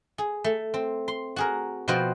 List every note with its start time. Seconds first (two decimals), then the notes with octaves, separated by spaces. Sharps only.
0.18 G#4
0.44 A3
0.74 C4
1.08 C6
1.36 F#4 G#4 A#4
1.88 B2 F3 F#4 C5 D#5 G5